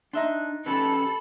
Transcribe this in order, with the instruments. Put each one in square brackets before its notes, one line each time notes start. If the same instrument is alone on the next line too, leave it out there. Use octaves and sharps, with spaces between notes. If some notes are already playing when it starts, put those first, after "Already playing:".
[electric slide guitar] D4 [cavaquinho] D#4 E5 C6 [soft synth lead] F#6
[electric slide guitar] C#4 G4 B4 [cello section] A4 [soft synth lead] B5